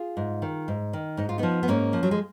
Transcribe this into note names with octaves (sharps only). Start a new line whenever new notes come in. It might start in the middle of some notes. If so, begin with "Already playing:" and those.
Already playing: F4 G#4
G#2
D#3
G#2
D#3
G#2 D#4
F4
F3 B3 D#4
B3
G#2 A#3 C#4
F3
F#3
G#3